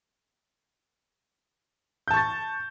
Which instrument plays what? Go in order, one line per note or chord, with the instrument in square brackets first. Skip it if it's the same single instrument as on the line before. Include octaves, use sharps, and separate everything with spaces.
[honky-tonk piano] G6
A5
C#6
A6